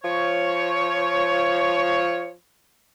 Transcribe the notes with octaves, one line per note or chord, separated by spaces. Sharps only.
F3 C#5